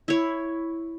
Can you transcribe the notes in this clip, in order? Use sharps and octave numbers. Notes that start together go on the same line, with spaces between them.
E4 C#5